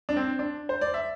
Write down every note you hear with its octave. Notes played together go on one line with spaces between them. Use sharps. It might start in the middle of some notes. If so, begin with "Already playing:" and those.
D4
C4
D4
C5
D5
E5